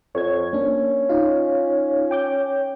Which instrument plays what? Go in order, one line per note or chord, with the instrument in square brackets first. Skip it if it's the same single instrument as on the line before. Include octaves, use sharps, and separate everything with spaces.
[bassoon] F2 [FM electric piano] C#5 G#6
[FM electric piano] A#3 D4 [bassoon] C#4
[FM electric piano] D#4 F4 F5
G5 D6 G6